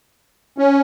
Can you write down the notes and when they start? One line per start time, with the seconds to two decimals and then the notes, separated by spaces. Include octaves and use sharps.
0.58 C#4